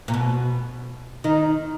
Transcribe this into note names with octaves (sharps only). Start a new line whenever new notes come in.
A#2
B2
D#3 D#4